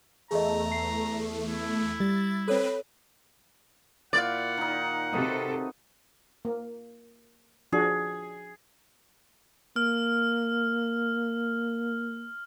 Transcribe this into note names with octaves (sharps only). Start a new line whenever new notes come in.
E2 A3 G#4 D#5 A#5
C7
E4
G3 A6
C4 A4 B4 C#5
A#2 E4 D5 F5 F#5
D#3 D#4
C3 F#4 A4 B4 D#5
A#3
F3 D4 F#4 G#4
A#3 F6